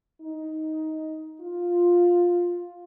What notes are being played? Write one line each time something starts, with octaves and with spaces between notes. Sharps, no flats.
D#4
F4